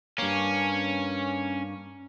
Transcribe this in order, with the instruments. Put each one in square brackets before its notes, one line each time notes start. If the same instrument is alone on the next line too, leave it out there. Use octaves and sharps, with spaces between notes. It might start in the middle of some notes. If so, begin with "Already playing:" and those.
[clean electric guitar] G2 A#3 [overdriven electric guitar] C#4